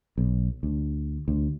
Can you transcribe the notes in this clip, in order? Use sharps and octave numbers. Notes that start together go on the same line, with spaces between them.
B1
D2
D2